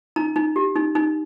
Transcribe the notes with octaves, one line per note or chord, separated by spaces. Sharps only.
D#4 A#5
D#4
G4
D#4
D#4